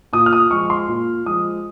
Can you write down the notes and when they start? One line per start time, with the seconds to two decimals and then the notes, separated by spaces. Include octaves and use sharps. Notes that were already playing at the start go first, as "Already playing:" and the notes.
0.13 A#2 D#6
0.26 F6
0.33 D#6
0.51 F3 G#3 C#6
0.70 C6
0.88 A#2
1.26 F3 G#3 D#6